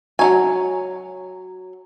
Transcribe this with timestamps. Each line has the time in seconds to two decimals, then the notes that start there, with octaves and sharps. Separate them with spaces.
0.19 F#3 D#4 F#4 G#5 A#5 C#6